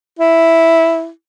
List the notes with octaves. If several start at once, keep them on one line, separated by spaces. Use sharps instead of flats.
E4